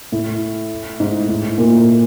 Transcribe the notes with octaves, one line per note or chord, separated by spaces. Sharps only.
A2
G#2
A2
A#2